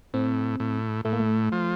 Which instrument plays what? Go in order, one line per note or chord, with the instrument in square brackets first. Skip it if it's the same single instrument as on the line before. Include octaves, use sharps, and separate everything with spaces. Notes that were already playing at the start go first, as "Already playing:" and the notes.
[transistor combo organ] A2 [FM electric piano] C4
[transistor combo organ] A2
[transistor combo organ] A2 [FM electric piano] A3
[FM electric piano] A#3
A3
[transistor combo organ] F3